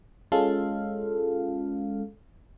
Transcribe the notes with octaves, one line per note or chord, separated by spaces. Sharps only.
G#3 C#4 F4 A4 F5